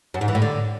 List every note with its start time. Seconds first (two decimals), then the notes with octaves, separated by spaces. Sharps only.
0.14 F#2
0.21 G#2
0.28 E3
0.35 A2
0.42 D3